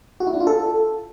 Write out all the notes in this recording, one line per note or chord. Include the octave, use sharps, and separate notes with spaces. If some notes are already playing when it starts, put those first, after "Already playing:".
F#4
E4
D4
F4
A4